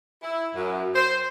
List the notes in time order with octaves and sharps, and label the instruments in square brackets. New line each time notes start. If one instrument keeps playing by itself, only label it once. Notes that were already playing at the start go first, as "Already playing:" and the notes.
[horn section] E4
F#2
C5